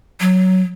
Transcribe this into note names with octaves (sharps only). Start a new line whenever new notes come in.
F#3